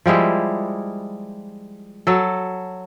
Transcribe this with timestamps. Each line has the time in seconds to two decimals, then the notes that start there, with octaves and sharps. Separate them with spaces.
0.06 F3 G3 G#3 E4
2.07 F#3 A4